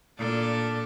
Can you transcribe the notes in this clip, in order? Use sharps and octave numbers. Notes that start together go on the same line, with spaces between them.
A#2 D4 A4